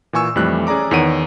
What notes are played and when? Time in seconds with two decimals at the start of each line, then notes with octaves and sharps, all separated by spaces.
0.13 A#2 E3 G#5 C#6 E6
0.36 F2 E3 G3 A3 F#6
0.67 C#4 G#4 D5 A#5 D6
0.91 E2 D#3 C#5 F#5 D7 D#7